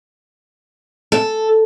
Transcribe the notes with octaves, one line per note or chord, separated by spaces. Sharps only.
A4